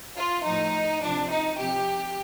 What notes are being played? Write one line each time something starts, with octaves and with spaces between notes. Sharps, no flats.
F4
A2 F3 D#4
C3 F3 D4
D#4
C3 F3 G4